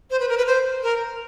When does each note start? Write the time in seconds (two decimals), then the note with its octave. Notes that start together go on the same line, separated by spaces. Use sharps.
0.10 C5
0.19 B4
0.28 A#4
0.37 B4
0.46 C5
0.83 A#4